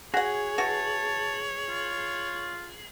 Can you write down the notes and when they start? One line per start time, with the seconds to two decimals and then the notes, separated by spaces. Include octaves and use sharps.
0.14 F#4 G#4 C#5 F#5
0.58 E3 F#4 A5
1.69 F4